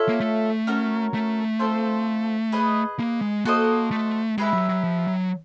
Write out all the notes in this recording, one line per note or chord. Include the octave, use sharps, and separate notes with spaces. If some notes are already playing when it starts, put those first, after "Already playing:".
Already playing: F4 A4 C#5 E5
A#3
A3
C#4 F#4 A#4 C#5
A3
C4 F4 A4 C5
G#4 B4 D#5
A#3
G#3
A#3 F#4 A4 C5 D#5
A3
G#3 G4 B4 E5
F#3
F#3
F3
F#3